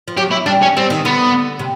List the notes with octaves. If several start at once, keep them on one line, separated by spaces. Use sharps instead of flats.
F3
F#3 G4
E4
G3 D4
C#4
G3 C4
D#3
D3 B3
C3